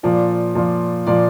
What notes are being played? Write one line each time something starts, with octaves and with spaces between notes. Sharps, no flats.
A#2 F3 D5
A#2 F3
A#2 F3 D5